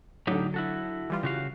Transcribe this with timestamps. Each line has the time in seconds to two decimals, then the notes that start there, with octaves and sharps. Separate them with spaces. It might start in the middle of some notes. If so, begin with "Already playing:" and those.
0.27 A2 D3 F#3 D#4 G4
0.54 E4 F#4 A4
1.10 E3 G3 F4
1.23 C#3 F#4 F5